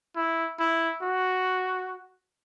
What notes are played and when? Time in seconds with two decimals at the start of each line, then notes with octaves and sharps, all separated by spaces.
0.17 E4
0.60 E4
1.02 F#4